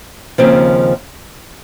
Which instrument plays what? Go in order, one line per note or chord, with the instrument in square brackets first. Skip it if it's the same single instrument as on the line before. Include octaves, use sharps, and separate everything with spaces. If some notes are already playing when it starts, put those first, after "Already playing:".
[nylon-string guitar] D#2 C#3 F3 C4